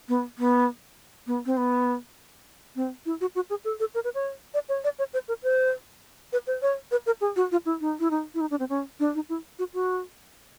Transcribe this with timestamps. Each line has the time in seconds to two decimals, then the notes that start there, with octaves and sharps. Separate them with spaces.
0.08 B3
0.38 B3
1.27 B3
1.46 C4
1.57 B3
2.76 C4
3.06 E4
3.21 F#4
3.35 F#4
3.50 G#4
3.65 A4
3.80 A4
3.95 A#4
4.04 B4
4.15 C#5
4.54 D5
4.69 C#5
4.84 D5
4.99 C#5
5.14 C5
5.28 A#4
5.43 C5
6.33 B4
6.47 C5
6.62 C#5
6.91 B4
7.06 A#4
7.21 G#4
7.36 F#4
7.52 F4
7.66 E4
7.81 D#4
8.00 E4
8.11 D#4
8.34 E4
8.41 D#4
8.50 D4
8.60 C4
8.69 C#4
9.00 D4
9.15 D#4
9.29 E4
9.59 F#4
9.74 F#4